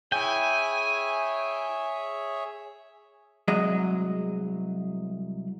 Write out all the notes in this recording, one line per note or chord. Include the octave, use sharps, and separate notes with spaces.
E4 G#4 C#5 E5 G5 G#5
C2 F#3 G#3 D#5